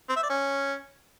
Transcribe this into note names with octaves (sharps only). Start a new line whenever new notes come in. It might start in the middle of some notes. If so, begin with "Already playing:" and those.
C4
E5
D5
C#4